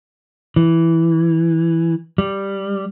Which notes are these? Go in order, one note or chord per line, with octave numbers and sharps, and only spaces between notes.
E3
G3